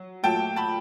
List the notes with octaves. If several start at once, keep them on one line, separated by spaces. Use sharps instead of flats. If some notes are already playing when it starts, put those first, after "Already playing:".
Already playing: F#3
A#2 F#3 A3 G5 A5
A5 B5